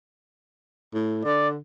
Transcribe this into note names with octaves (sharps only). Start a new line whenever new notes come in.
A2
D3 D5